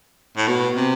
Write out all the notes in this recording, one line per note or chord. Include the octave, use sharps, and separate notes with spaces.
A2
B2
C3